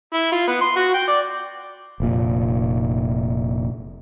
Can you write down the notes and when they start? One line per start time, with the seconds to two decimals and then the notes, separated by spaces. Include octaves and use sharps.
0.14 E4
0.33 F4
0.48 B3
0.62 C6
0.77 F#4
0.94 G5
1.08 D5
2.00 F1 A#2